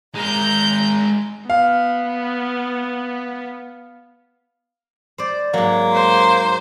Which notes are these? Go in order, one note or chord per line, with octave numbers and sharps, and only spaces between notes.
G#3 A#4 A#5 G6
B3 F5
C5 D5
G#2 F#3 A#3
C5